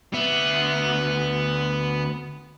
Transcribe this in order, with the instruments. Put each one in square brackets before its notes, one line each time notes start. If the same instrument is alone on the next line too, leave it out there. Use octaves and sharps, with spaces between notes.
[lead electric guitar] D2 E5 [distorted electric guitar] B3